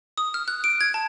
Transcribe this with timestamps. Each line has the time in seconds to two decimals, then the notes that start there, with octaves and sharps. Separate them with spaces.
0.18 D#6
0.34 F6
0.48 F#6
0.64 D7
0.81 G#6
0.94 A5